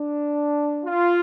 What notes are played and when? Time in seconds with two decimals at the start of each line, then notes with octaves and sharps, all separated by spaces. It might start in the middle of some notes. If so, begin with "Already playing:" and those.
Already playing: D4
0.85 F4